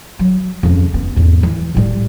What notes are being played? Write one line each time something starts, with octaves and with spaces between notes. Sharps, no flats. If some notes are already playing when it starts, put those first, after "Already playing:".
F#3
F2 C#3
B3
E2 G#2
E3
A2 G3